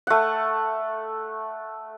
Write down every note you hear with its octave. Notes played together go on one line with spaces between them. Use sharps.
A3 F#5